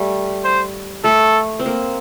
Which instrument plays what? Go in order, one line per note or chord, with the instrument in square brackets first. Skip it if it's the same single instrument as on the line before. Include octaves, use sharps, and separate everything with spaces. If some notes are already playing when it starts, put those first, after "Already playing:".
Already playing: [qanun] G3 A3
[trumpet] C5
[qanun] A3 [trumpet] A4
[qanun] C4
A#3